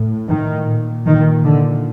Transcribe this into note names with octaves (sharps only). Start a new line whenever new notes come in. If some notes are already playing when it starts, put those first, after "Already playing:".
Already playing: A2
D#3
A#2
D#3
D3